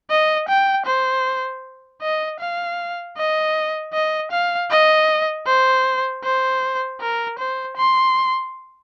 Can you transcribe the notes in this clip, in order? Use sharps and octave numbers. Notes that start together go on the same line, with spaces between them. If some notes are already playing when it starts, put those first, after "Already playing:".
D#5
G5
C5
D#5
F5
D#5
D#5
F5
D#5
C5
C5
A#4
C5
C6